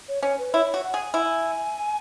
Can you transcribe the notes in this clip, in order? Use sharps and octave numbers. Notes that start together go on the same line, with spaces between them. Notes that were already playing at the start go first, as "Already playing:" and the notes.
C#5
C#4 C#5
B4
E4 C#5
F#4
F#5
G#4
E4 G#5